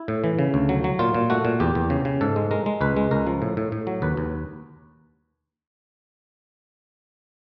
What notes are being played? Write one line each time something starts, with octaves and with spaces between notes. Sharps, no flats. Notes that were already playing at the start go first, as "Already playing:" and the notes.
Already playing: E4
A2
E3
C#3
D2
F#3
F#3
A#2 F4
A#2
A3 F#4
A#2
E2 G4
E2
C#3
C#3
G#2 A4
G#3
G#3 A#4
G#3
C#2 B4
G#3
C#2 A#4
F3
A2
A2
A2
F#3
D#2 B4
D#2